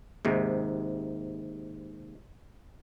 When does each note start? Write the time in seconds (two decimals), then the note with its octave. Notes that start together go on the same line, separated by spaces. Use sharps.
0.25 D#2 G#2 C3